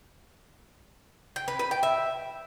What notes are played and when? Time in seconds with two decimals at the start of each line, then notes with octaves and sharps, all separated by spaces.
1.36 G5
1.48 B4
1.59 B4
1.71 G5
1.83 E5